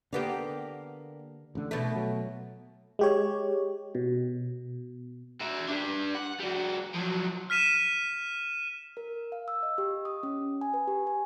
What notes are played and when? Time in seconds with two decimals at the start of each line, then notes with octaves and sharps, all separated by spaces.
0.13 D3 A#3 B3 G4
1.55 A1 D3
1.71 B2 A3
1.96 F#3
2.99 G#3 G4 C#5
3.95 B2
5.40 F#4 E5
5.68 D4 G4
6.15 F#5
6.40 G3 F#4
6.94 F3 F#3
7.50 F6 B6 D#7 E7
8.97 A#4
9.32 F5
9.48 E6
9.63 D#5
9.78 G4
10.05 D#6
10.23 C#4
10.61 G#5
10.74 B4
10.88 G4
11.07 G#5